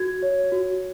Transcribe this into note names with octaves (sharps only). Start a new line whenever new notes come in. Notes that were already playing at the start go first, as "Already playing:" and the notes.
Already playing: F#4 G#6
C#5
F#4